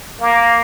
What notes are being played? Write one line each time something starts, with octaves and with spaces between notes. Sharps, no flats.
A#3